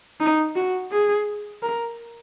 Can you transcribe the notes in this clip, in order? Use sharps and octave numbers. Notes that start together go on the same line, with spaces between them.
D#4
F#4
G#4
A#4